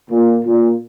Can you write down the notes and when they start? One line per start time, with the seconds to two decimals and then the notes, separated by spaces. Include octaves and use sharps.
0.10 A#2
0.45 A#2